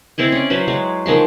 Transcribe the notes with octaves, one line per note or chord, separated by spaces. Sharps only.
C4 E4 G#4 D#5
C#4 D5
F#3 F#4 B4 C5
F#3 G#3
D#3 F3 G#3 C6